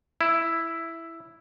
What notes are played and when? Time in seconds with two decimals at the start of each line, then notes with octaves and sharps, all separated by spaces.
0.21 E4